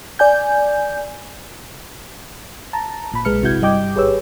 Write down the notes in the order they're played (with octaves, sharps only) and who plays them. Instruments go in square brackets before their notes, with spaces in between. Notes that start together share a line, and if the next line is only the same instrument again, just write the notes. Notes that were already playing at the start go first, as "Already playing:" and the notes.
[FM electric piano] D5 G#5 G6
A5 A#5
G#1 A#2 B5
B1 G#3 B4 F6 C#7
G1 C3 E4 F#4 G6 G#6
G2 G3 D#5 G5 D6 G6
G#1 G4 G#4 B4 C#5 E6